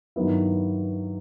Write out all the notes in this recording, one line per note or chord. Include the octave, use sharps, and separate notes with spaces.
G2 D#3 F#3 B3 E4